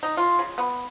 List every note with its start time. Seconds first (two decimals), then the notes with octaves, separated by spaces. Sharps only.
0.03 D#4
0.17 F4
0.39 C#3
0.58 B3